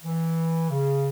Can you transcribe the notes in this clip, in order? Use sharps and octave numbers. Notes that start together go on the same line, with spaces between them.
E3
C#3